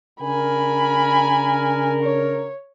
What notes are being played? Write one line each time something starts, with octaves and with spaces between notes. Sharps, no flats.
C#3 D4 A#4 G#5 B5
C#5